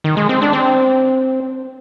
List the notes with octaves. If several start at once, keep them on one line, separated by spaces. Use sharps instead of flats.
D#3
G#3
C4
D4
C4